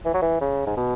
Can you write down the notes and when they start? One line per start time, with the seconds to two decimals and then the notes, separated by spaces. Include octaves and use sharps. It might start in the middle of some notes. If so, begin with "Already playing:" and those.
0.05 E3
0.14 F#3
0.22 E3
0.41 C#3
0.67 G#2
0.77 B2